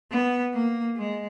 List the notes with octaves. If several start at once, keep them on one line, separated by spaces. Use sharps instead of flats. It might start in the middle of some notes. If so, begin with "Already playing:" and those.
B3
A#3
G#3